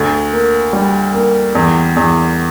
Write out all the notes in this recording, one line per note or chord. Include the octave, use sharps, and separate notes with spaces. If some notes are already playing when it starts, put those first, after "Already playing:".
Already playing: D2
A#3
G3
A#3
E2
E2